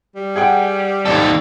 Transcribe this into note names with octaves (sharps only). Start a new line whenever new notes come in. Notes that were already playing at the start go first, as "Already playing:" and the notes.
G3
G#4 F#5 G5
D#2 A4 D5